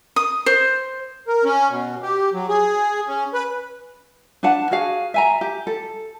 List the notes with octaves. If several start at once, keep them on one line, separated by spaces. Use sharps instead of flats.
D#6
C5
A#4
C#4
B2
G4
F#3
G#4
C#4
B4
D4 B4 F#5 A5
F#4 G#4 F5
E5 G#5 A#5
G4
A4